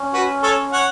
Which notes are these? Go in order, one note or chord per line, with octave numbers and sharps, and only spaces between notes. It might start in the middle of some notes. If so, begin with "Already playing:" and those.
Already playing: C#4
F#4 B4
A4 C#5
C#5 F#5